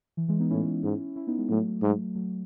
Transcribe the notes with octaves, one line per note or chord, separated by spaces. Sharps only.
E3
E3 G#3
B3 D#4
A2 C#4 E4
G#2
C#4 E4
B3 D#4
G#3 B3
A2 F#3 A3
G#2
F#3 A3